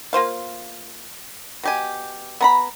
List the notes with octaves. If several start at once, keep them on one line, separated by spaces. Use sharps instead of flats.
A#3 F4 C5 F5
B2 G4 G#5
B3 A#5 B5